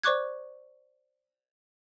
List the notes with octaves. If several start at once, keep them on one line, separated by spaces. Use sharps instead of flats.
C5 D5 C#6 D6 F#6 G#6